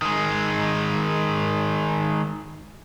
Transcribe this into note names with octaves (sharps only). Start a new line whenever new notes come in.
D#3 G#3